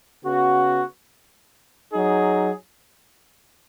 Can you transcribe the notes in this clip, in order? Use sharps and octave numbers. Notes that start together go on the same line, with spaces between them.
C#3 B3 F#4
F#3 D#4 G#4